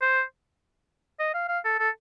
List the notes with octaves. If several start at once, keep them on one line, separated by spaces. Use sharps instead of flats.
C5
D#5
F5
F5
A4
A4